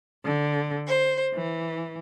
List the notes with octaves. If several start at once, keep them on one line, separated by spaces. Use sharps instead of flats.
D3
C5
E3